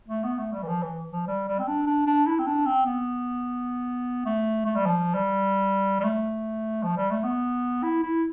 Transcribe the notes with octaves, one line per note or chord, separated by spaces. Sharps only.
A3
B3
A3
G3
E3
F3
E3
F3
G3
G3
C4
D4
D4
D4
E4
C4
D4
C4
B3
A3
A3
G3
F3
G3
G3
A3
F3
G3
A3
B3
E4
E4